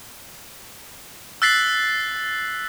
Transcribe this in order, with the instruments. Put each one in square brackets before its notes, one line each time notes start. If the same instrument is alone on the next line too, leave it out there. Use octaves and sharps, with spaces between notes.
[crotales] E6 F#6 A6 B6 C7 F#7